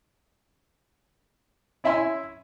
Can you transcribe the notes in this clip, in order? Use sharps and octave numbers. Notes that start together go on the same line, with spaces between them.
C#4 E4 E5 G#5 C6